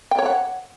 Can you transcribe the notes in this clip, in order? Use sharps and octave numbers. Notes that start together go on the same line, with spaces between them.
G5
C#5
F#5